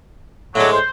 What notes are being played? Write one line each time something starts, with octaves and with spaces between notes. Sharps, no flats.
A2 D3 F#3 G#3
C5